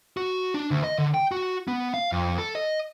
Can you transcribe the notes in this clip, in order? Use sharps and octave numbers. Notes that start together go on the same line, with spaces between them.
F#4
D4
D2
D#5
D3
G5
F#4
B3
F5
F2
A4
D#5